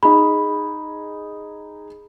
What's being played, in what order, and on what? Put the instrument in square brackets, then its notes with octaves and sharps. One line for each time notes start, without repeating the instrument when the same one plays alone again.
[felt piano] D#4 G#4 [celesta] B5